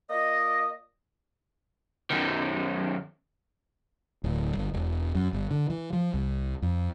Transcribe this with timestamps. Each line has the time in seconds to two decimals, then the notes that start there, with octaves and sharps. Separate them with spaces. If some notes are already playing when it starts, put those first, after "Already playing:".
0.10 A#3 F4 D5 D#5
2.10 F#2 D#3
4.24 D1
4.57 G1
4.74 E1
5.15 F#2
5.33 G1
5.51 D3
5.70 E3
5.93 F3
6.14 C2
6.62 F2